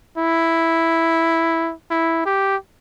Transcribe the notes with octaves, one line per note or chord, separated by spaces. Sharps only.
E4
E4
G4